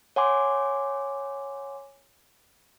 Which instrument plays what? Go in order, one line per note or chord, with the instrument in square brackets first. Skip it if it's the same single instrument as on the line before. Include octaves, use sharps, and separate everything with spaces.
[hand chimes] C#5 F#5 G#5 C6 D6